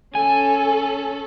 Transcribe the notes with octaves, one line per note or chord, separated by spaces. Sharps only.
C#4 A4 G#5